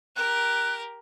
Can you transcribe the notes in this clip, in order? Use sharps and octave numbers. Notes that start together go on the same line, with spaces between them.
G4 A#4 F#6